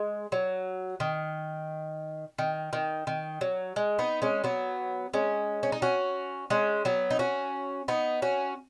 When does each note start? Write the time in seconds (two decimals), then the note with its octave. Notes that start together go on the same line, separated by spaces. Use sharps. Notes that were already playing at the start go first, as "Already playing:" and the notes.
Already playing: G#3
0.32 F#3
1.00 D#3
2.38 D#3
2.73 D#3
3.07 D#3
3.41 F#3
3.76 G#3
3.99 B3 D#4
4.22 G#3 C#4
4.44 F#3 B3
5.14 G#3 C#4
5.63 C#4
5.72 D#4
5.82 C#4 F#4
6.50 G#3 C#4
6.85 F#3 B3
7.10 D#4
7.19 C#4 F#4
7.88 B3 D#4
8.22 C#4 F#4